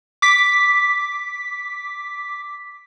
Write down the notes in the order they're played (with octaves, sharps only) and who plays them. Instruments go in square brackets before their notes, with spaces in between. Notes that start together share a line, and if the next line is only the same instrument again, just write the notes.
[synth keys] D6 B6